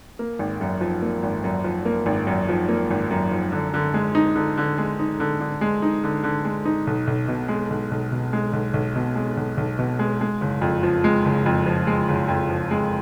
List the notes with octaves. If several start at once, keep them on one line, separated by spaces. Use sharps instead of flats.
A#3
G#1
F#2
F3
A#3
G#1
F#2
F3
A#3
G#1
F#2
F3
A#3
G#1
F#2
F3
D3
D3
G#3
D#4
D3
D3
G#3
D#4
D3
D3
G#3
D#4
D3
D3
G#3
D#4
B1
B1
B2
G#3
B1
B1
B2
G#3
B1
B1
B2
G#3
B1
B1
B2
G#3
G#3
F#1
F2
F3
G#3
F#1
F2
F3
G#3
F#1
F2
F3
G#3